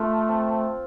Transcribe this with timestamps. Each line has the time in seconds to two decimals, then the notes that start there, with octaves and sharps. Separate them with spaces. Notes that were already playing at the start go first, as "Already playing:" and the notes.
Already playing: A3 F4
0.28 C4